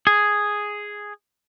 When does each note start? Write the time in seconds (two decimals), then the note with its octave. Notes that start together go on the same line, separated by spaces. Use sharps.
0.07 G#4